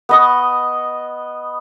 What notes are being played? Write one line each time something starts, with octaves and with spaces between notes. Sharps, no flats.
B3 D#5 C#6